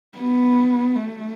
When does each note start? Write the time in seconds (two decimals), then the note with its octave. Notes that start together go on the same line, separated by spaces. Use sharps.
0.18 B3
0.96 A3